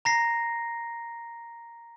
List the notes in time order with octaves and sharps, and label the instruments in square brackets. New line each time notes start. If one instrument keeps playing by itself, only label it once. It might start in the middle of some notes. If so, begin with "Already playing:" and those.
[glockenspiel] A#5 A#6 C7